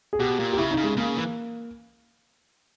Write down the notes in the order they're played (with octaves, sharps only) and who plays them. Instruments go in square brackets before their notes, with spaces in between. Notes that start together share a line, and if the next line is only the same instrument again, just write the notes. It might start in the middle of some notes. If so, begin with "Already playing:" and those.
[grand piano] G#4
[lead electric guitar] B2 [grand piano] G4
[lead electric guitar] A#2
[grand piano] G4
[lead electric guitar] C#3 [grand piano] E4
[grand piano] D#4
[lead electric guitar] C#3
[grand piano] G#3
[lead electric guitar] C#3 [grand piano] A#3
[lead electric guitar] E3